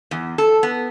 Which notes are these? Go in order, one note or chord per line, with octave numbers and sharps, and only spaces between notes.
E2
A4
B3